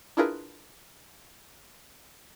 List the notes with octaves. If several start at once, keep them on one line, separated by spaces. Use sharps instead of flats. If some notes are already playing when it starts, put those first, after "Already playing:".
D4 E4 F4 G#4 A#4 B4